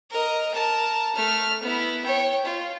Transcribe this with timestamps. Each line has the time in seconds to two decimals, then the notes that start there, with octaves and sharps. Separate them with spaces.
0.10 A#4 D#5
0.53 A#4 A5
1.15 A3 F6
1.62 B3 E4
2.04 C#5 G5
2.45 F4